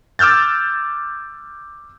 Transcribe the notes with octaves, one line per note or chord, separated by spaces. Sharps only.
D6 E6 F6 G6 A6